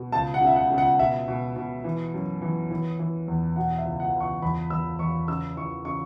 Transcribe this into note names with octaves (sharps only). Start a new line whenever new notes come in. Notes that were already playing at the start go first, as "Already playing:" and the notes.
Already playing: B2
C#2 A5
F#5
C#3
E5
F#5
C#3
F#5
B2 E5
B2
B2
E3
F#2
E3
E3
E3
E2
B2 F#5
E5
C#2
F#5
C#2
C#6
E2 B5
E2 E6
E2 C#6
C#3 E6
E3 C#6
C#3 C#6